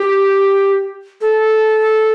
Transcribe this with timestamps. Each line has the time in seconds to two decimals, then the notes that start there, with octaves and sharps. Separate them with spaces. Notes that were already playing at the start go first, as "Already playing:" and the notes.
Already playing: G4
1.21 A4